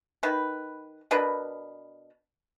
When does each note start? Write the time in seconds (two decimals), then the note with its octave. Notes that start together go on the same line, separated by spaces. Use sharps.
0.23 D#3 B4
1.11 B2 D4 A#4 B4